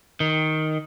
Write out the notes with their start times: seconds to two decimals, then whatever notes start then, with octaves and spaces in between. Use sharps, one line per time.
0.20 D#3